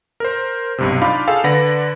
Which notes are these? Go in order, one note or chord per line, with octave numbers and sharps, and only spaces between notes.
A#4 C5
B1 G2 C3
D4 D#4 F4 F5 B5 D6
G#4 A4 F5 G5
D3 B4 D5 F#5 A#6